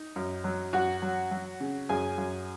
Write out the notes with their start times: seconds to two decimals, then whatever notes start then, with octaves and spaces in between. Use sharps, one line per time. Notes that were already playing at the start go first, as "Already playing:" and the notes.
Already playing: D#4
0.16 F#2
0.44 F#3
0.73 F#2 F#4 F#5
1.02 F#3
1.31 F#3
1.60 C#3
1.89 F#2 G#4 G#5
2.18 F#2